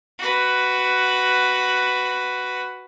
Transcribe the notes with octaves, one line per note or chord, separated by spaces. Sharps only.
F#4 B4